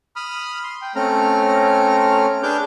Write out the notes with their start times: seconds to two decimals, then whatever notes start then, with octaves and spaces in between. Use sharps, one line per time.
0.16 B5 D#6 F6
0.64 C6
0.82 G5
0.95 A3 C4 C#4 A#5 F6
2.43 D4 G#4 B4 D6 F6 G6